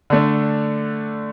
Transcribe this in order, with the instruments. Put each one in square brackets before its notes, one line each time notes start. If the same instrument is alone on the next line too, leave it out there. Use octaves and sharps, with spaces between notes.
[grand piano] D3 A3 D4